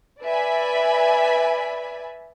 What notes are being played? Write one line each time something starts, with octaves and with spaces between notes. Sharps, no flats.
B4 D5 E5 G#5 B5